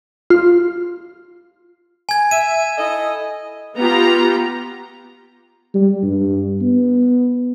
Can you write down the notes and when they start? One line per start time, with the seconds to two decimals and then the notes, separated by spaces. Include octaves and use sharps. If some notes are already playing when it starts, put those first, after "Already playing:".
0.30 F4
2.09 G#5 G#6
2.31 E5 D#7
2.77 E4 A4 D#5
3.77 B3 F4 G4 A#5
5.75 G3
6.03 G2
6.61 B3